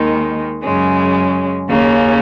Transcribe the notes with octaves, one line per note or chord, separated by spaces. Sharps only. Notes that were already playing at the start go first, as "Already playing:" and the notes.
Already playing: D#2 D#3 G#3 D#4
F#2 C#3 G#3 C#4
D#2 C#3 A#3 C#4